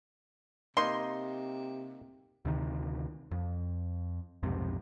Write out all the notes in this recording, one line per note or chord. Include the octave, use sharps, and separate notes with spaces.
C3 A#3 D#4 C6
D2 C3 D#3
F2
B1 F2 G#2 C3